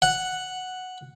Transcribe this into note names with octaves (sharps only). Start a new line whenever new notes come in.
F#5